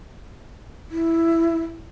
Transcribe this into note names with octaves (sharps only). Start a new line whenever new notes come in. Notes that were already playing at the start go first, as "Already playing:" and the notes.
E4